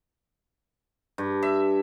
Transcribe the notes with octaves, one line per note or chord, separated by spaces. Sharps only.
G2
E5